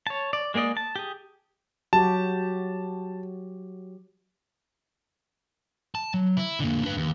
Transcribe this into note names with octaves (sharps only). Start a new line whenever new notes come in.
C#5 A5
D5
G#3 A#3 G#4 D5 D#5
A5
G4 G#4
F#3 F#4 G4 A5
A5
F#3
E4
D3 A#3
D4 B4
D#2